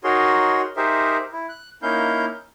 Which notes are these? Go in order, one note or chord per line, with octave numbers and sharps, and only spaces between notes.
D#4 F#4 G#4 A#4 C#5 C6
D#4 G4 G#4 A#4 C5 E5
E4
F#6
A#3 C#4 D#4 E4 F5 G6